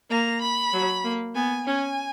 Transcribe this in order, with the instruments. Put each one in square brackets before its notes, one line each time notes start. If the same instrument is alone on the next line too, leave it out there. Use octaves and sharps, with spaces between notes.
[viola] A#3 [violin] A#5
[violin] B5
[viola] F#3
A#3
[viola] B3 [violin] G#5
[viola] C#4 [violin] G#5